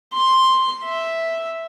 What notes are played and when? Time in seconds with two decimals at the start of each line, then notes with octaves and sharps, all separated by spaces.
0.14 C6
0.84 E5